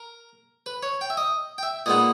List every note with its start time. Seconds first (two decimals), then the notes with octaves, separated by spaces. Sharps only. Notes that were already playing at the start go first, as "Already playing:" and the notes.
Already playing: A#4
0.66 B4
0.83 C#5
1.01 G5
1.10 E5
1.17 D#5
1.58 G5
1.63 E5
1.86 A#2 G#3 B3 D#4 D#5